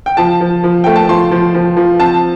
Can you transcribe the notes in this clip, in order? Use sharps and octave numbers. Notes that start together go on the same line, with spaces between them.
G5
F3 A5
F3
F3
A3 G5
A5
F3 C6
F3
F3
F3
C4 A5